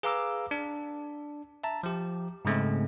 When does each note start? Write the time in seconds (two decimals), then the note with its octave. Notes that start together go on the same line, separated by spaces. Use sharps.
0.03 G#4 B4 F5 A#5 D6 E6
0.51 D4
1.64 E5 A5 A#5
1.83 F3 G4
2.45 G#2 C#3 G#3 A3 C4